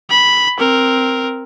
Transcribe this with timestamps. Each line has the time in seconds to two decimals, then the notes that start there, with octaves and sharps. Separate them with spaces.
0.11 B5
0.59 C4 A#4